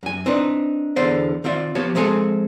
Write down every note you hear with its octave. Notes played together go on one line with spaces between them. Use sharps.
F#2 G#5
C4 D4 D#4 B4
E2 D3 B3 C5 D5
D#3 C4 F4 D5 E5
F3 B3 G4 C#5 A5
F3 G#3 C4 A4 G#5